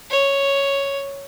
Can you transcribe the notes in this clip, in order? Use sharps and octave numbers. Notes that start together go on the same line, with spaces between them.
C#5